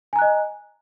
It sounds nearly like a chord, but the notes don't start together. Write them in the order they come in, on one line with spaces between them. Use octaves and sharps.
G#5 A#5 F#6 D#5